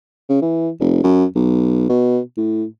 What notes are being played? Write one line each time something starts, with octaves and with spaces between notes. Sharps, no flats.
C#3
E3
F1
F#2
B1
B2
A2